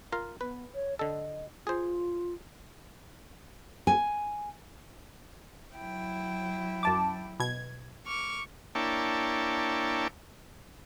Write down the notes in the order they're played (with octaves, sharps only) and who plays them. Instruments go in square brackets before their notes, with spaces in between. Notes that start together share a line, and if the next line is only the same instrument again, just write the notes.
[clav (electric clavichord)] F4 A#4 F5
[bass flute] B3 [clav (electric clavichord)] B4
[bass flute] C#5
[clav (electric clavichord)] D3 A4 [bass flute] D#5
[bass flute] F4 [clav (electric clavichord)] G#4 C5
[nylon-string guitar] G#5
[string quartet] F#3 E4 G5
[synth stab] F#2 A5 D6
B2 G#6
[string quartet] C#6 D6 F6
[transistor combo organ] A#3 D4 E4 C#5 G5 A5